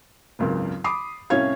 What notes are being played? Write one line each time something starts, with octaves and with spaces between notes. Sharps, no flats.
G#1 C#2 F#2 C#3
B5 D6 D#6 C7
C2 A2 C#4 C#5 F5 G#6